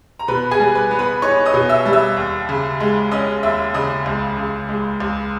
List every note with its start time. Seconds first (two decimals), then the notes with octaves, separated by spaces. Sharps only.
0.19 A#5
0.28 B2 B4 B5
0.51 G#4 G#5
0.59 G3
0.75 B4 B5
0.91 B3
0.99 B4 B5
1.22 D#4 C#5 C#6
1.46 D#5 D#6
1.54 B2
1.69 E5 E6
1.86 G3
1.93 E5 E6
2.17 D#2
2.49 C#3
2.80 G#3
3.11 C#4 D#5 D#6
3.43 D#2 E5 E6
3.74 C#3 D#5 D#6
4.06 C#2
4.38 C#3
4.69 G#3
5.00 C#2